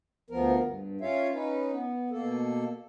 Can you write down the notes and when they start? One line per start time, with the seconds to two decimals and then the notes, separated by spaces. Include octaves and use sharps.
0.30 D2 F3 B3 A#4
0.63 G2
1.01 C#4 F4 C#5 E5 F5
1.33 C#4 D#4 B4
1.72 B3
2.10 B2 A#3 A4